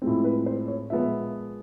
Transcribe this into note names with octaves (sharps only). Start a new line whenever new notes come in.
A2 F3 G#3 C4
B4
C5
C#5
A#2 F3 G#3 B3 E5